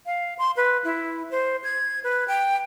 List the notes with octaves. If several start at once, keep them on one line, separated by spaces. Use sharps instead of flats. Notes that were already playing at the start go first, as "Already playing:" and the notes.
F5
C6
B4
E4
C5
G#6
B4
G5